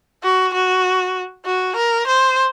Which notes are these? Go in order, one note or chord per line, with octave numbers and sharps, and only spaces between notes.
F#4
F#4
F#4
A#4
C5